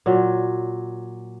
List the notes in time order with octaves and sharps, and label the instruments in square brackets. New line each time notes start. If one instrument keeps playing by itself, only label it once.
[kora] A#2 F#3